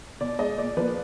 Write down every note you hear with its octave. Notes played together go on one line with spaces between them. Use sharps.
B2 D5
G#3 D#5
A#2 D5
F3 A#3 B4